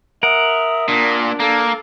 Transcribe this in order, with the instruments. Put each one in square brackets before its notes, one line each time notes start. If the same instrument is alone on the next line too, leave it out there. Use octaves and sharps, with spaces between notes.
[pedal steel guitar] A#4 F#5 [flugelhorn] E5 [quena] D#6
[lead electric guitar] A#2 [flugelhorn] D4
[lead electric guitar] A#3 [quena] A4